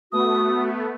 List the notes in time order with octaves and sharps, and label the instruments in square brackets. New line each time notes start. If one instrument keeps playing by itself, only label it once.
[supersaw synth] A3 B3 [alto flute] F#4 [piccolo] D#6